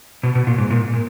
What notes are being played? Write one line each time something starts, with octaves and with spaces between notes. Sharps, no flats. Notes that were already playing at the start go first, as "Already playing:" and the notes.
B2
B2
A#2
G#2
A#2
A#2